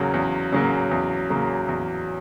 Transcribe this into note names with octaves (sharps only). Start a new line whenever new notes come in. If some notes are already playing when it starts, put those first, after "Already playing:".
Already playing: E2 C#3 F#3 A#3
E2
C#3 F#3 A#3
E2
C#3 F#3 A#3
E2